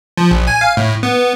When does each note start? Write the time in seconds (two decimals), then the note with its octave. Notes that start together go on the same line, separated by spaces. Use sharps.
0.17 F3
0.31 A#1
0.47 G#5
0.61 F5
0.77 A2
1.03 B3